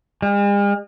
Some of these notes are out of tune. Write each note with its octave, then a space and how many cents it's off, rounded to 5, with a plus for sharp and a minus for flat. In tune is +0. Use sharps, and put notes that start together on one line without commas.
G#3 -45